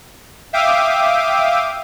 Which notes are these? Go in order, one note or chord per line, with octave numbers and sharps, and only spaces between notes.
E5 F5 G5 D6 D#6